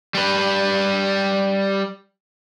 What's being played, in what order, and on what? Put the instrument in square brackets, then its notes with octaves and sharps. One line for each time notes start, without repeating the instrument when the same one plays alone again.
[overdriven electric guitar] G3 B4